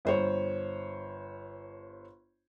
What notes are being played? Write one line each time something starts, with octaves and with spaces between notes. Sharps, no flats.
G1 C5 C#5